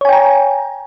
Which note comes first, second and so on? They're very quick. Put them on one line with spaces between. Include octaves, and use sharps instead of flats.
C#5 G#5 G5 A#5